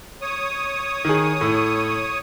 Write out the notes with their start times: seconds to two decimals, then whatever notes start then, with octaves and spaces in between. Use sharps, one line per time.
0.22 C#5 D#6
1.04 D#3 G#4
1.41 A2